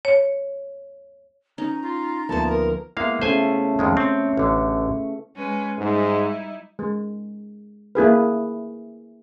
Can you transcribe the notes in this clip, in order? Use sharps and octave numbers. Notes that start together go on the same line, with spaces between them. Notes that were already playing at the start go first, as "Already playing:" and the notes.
C#5
C#4 D#4 A#5
F4
D2 F3 A#3 B3 A5
A#4
G#3 A#3 B3 E4 F5
C#3 A3 C5 G#5
F2 D#3 G#3
C4 C#5
A1 D3
G#3 C#4 B4
G#2 G3 D#4 E4
G#3
A#3 E4 G#4 B4